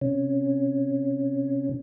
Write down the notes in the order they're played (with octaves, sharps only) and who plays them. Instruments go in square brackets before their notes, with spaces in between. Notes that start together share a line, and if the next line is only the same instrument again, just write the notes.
[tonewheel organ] C3 C#4